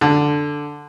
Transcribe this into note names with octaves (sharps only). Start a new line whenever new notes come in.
D3